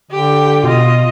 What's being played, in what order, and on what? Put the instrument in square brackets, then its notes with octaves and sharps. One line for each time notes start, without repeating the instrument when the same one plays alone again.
[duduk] D3 [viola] G4 G5
[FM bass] B2 [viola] F4 D#5